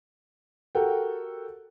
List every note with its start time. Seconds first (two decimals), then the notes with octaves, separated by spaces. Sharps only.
0.75 F#4 G4 A4 A#4 F#5 G5